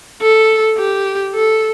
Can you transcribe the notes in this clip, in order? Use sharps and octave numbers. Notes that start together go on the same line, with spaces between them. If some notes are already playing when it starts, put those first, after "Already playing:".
A4
G4
A4